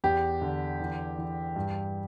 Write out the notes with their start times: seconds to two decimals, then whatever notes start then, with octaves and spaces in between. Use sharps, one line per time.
0.04 E2 G4
0.42 D3
0.80 E3
1.18 E3
1.56 G2